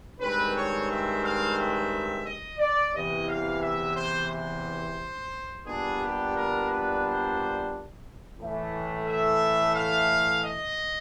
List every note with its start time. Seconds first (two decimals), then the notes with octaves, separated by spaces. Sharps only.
0.20 G2 D#3 G#3 C4 B4
0.55 C#5
0.89 E5
1.22 F5
1.57 E5
2.25 D#5
2.59 D5
2.94 E2 C3 E3 D#5
3.27 F5
3.62 E5
3.95 C5
4.30 C5
5.66 A#2 G3 B3 D4 G#4
6.01 G4
6.34 A#4
6.69 B4
7.02 C5
8.39 A2 E3 A3
9.07 E5
9.75 F5
10.43 D#5